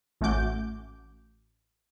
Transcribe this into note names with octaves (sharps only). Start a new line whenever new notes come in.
A1 A3 C#4 F#4 D6 G6